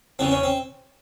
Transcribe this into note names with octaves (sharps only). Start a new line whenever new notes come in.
E2 C#3 E3 C4
C#4
C4